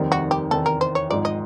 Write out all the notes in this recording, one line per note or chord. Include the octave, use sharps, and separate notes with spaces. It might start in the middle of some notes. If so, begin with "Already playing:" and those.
Already playing: F1 D#2 D#3 G3 C4
F#4
G4
E2 C3 D#3 A4
A#4
C5
C#5
G#1 G#2 F3 D5
D#5